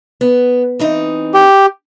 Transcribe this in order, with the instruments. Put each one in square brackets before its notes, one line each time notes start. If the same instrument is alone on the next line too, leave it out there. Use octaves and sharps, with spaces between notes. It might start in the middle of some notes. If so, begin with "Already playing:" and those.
[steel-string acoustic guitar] B3
E3 C4 D#4
[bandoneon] G4